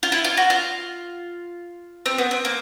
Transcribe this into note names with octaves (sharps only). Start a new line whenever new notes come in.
F4
E4
F4
F#4
F4
C4
B3
C4
A#3